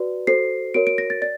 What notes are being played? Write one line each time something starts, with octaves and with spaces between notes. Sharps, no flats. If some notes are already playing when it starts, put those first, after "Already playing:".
Already playing: F#4 B4 D5
F#4 A4 C5 C7
F#4 A#4 C#5 D7
D7
A#6
A6
D5 A6